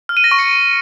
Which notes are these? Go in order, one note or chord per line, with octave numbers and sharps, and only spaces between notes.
F6
D#7
A#6
C#6
C#7